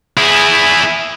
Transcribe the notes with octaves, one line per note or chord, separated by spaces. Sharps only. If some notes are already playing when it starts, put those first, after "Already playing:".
E4 G#4